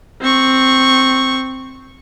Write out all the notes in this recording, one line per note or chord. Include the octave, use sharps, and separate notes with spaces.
C4 C#6